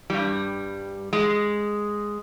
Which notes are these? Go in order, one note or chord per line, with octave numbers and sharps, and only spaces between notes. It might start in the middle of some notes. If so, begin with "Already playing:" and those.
G2 G3
G#3